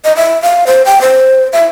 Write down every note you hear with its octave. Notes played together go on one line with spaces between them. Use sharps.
D#5
E5
F5
C5
G5
C5
E5